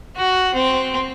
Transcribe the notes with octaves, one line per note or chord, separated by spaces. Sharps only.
F#4
C4